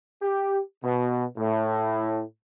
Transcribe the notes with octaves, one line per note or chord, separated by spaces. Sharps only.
G4
B2
A2